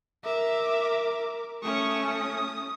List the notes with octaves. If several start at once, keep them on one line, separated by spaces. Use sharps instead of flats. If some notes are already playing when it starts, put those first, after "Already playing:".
A#4 E5 D6
A3 C#4 C#6 D#6
D#6